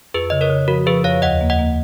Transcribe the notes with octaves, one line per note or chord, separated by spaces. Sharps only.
F2 G#4 B4
C#3 D#5
A#4 C#5
C#3
F3 F#4 A#4
F3 G#4 B4
F2 C#5 F5
D#2 D#5 F#5
A#3
D#5 F#5
A#3